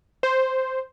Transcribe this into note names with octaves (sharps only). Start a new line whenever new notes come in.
C5